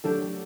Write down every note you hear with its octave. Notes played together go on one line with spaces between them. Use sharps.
F#3 A3 D4 G4 A4